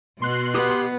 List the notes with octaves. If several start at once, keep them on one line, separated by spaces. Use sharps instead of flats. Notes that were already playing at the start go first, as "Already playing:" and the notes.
B2 C6 F#6
B3 G4 D#6